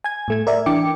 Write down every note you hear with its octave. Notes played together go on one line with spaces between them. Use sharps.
G#5 G#6
A2 A3 G#6
A#4 D5 E5
E3 D4 G5 D6 C#7